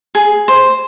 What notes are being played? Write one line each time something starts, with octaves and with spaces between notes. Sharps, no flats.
G#4
C5